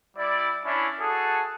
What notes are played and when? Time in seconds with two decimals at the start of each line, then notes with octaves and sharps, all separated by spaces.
0.17 G3 E4 D5
0.65 C#4 D4 E4
0.99 F#4 G#4 A4